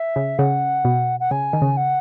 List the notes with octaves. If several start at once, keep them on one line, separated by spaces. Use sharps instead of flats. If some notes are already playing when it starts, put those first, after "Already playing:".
Already playing: E5
C#3
C#3 F#5
B2
F#5
C#3 G#5
D#3
C#3
F#5